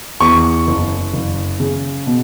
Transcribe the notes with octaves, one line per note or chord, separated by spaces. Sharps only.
E2 C#6
F#1
F#1
C#3
B2